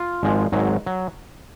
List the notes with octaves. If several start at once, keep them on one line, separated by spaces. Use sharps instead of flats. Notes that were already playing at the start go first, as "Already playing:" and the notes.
Already playing: F4
G#1 G#2 F3 G#3
G#1 G#2 F#3
F#3